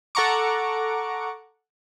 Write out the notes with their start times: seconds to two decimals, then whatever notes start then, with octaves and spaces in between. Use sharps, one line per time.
0.15 A4 F#5 A#5 C#6 D6